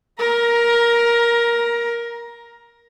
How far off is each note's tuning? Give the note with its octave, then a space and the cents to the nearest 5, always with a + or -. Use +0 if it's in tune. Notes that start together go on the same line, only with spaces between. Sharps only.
A#4 +10 A#5 +25